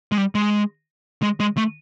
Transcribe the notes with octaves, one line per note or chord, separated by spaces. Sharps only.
G#3
G3
G#3
G#3
G#3
A3